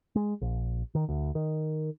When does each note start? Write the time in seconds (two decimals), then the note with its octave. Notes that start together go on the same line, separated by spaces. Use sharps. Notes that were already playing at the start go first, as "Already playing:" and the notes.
0.16 G#3
0.41 A#1
0.95 D#3
1.09 D2
1.35 D#3